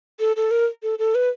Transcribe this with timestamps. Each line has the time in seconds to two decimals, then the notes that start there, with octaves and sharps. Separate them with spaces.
0.20 A4
0.36 A4
0.51 A#4
0.83 A4
0.99 A4
1.15 B4